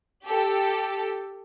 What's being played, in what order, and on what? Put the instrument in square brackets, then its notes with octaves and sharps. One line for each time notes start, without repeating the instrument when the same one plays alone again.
[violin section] G4 A4